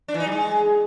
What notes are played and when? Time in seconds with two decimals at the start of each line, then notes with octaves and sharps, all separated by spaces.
0.08 D4
0.14 E3
0.20 D#4
0.26 G3
0.32 G#3